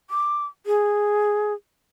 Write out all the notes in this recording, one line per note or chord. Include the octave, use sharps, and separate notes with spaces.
D6
G#4